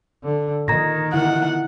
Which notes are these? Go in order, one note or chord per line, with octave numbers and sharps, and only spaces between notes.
D3
A#2 D#3 D#5 A#5 G#6 A#6
D3 E4 F#5